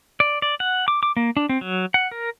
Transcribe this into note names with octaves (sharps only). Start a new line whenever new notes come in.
D5
D5
F#5
D6
D6
A#3
D4
C4
F#3
F#5
A#4